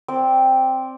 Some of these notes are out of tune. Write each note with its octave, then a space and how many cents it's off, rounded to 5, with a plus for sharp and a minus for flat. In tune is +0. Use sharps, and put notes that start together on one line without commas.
C4 +0 D5 -15